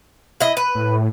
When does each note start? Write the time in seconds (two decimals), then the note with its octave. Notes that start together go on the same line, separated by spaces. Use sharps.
0.41 E4 D#5
0.57 B4
0.75 A2